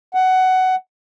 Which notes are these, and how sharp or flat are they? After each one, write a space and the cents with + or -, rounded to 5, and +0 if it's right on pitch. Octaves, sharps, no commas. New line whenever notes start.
F#5 +15